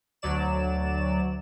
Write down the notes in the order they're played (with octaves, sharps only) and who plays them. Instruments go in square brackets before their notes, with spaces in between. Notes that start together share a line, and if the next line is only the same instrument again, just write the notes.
[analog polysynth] D2 F#3 D5 E7